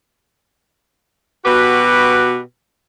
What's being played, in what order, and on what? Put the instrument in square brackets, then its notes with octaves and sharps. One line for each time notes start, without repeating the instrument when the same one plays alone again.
[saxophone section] B2 F#4 G4 B4